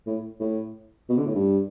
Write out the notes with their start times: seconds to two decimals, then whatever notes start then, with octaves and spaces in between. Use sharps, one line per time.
0.06 A2
0.40 A2
1.09 B2
1.17 D3
1.26 A2
1.35 G2